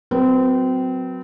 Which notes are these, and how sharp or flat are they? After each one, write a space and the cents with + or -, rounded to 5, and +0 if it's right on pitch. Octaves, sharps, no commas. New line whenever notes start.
F#3 +0 C4 -25 B4 -40